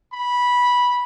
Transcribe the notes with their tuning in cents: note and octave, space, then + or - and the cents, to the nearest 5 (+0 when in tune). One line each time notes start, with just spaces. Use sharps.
B5 -10